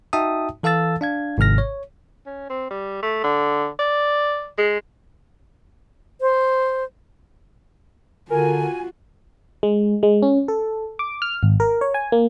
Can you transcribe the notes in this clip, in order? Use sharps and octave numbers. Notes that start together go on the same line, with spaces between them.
D#4 F#4 E5 G5 A5 D#6
E3 A4 F5 A5 E6 A6
D4 F5 G#6
G#1 G#2 C3 F6 A#6
C#5
C#4
C4
G3
A3
D3
D5
G#3
C5
D3 F4 F#4 A#4 G#5
G#3
G#3
C#4
A4
D6
F6
G#1
A#4
C#5
G#5
A#3